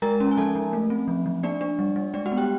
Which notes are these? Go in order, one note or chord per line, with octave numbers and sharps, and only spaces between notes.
G#3 A#4 A#5
C#4
G#5
F3 A4 A5
F3
A3
C4
F3
F3
A#3 D4 D5
D4
G3
G3
G#3 D4 D5
F#4 F#5
B3
G4 G5